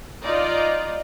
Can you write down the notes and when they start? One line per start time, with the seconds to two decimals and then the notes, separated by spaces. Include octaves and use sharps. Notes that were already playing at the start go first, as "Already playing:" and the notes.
0.24 D#4 F4 D5 D#5